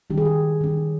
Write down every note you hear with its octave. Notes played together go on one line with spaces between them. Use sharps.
D#3 G3 C#4 G4
G#4
G4
D#3 G3 C#4